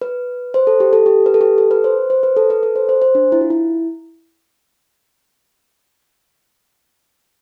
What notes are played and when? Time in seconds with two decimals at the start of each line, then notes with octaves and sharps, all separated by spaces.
0.02 B4
0.54 C5
0.67 A4
0.80 G4
0.93 A4
1.06 G4
1.26 B4
1.34 A4
1.41 G4
1.58 A4
1.71 B4
1.84 C5
2.10 C5
2.23 B4
2.37 A4
2.50 B4
2.63 A4
2.76 C5
2.89 C5
3.02 C5
3.15 D4
3.32 E4
3.41 F4
3.50 E4